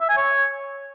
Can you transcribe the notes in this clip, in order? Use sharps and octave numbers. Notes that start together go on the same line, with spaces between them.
E5
G#5
C#5